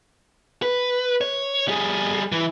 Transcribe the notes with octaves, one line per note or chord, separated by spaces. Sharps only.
B4
C#5
G3 G#4
E3